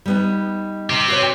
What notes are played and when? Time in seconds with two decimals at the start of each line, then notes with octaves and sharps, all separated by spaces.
0.06 G3 B3 D#4
0.90 C4 G4
1.08 F#4 B4 C#5